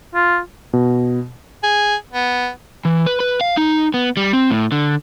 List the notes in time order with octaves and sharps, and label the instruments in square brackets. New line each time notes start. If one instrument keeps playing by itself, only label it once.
[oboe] F4
[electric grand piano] B2
[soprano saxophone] G#4
B3
[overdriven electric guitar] E3
B4
B4
F5
D#4
B3
G3
C4
A2
D3